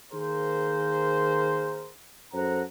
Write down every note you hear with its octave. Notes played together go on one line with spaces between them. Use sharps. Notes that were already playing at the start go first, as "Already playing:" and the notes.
D#3 A#3 G#4 A#4 C5
F#2 A4 C5 F#5 A#5